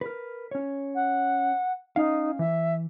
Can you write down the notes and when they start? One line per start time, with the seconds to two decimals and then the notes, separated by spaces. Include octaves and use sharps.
0.01 A#4 B4
0.51 C#4 C#5
0.95 F#5
1.96 C#4 D#4 F5
2.39 E3 E5